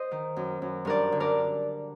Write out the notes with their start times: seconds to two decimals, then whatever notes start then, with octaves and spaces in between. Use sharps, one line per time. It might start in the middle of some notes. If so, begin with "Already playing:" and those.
Already playing: C5 D#5
0.11 D#3
0.36 F#2
0.62 F#2
0.85 G2 A#4 D5
1.12 D3
1.20 A#4 D5